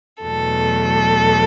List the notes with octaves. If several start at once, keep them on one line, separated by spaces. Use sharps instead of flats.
E2 B2 F#3 A3 A4